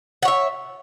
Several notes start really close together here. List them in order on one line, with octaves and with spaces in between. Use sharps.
F#5 C#5 E5